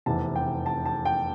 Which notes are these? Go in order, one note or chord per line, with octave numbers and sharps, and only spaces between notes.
F1 E2 C3 E3 A5
G5
A5
A5
G5